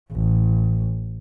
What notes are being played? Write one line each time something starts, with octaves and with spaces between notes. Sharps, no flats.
A1